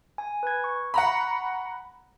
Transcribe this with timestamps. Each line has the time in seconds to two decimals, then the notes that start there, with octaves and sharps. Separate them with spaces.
0.18 G#5
0.43 B4 G#6
0.64 C#6
0.94 F#5 A#5 B5